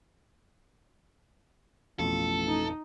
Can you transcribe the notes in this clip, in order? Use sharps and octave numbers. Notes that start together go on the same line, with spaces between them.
A1 F2 B2 F4 A4
D#4